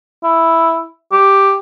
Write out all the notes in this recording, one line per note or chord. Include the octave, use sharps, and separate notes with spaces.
E4
G4